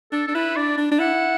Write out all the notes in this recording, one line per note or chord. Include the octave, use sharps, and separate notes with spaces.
D4 A4
D4 A4
E4 B4
D4 D5
D4
D4
E4 F#5